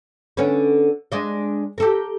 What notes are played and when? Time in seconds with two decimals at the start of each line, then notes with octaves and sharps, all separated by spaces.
0.37 D3 B3 C#4
1.12 G#3 D4 D#5
1.78 G4 A4 A#4